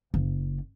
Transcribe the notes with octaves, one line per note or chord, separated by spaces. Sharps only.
F#1